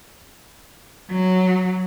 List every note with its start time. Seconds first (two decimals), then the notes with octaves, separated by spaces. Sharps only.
1.10 F#3